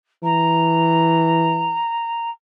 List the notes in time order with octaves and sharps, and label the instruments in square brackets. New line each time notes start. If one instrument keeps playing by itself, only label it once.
[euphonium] E3 [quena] A#5